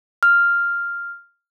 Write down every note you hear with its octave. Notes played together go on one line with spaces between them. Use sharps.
F6